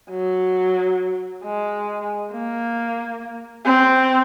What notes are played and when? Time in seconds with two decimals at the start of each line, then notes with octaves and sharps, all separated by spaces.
0.11 F#3
1.44 G#3
2.33 A#3
3.65 C4